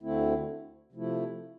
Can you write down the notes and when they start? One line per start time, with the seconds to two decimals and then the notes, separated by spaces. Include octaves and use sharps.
0.02 D2 D3 A3 C4 E4
0.93 C3 F3 A3 E4